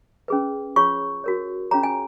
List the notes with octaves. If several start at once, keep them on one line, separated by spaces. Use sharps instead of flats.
C#4 G#4 B4
F4 G#4 C#5 C#6
F#4 A#4 C#5
C#4 F4 G#4 C#5 A#5
G#5